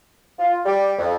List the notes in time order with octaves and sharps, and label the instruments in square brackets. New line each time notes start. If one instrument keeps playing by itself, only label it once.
[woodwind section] F4
G3
F2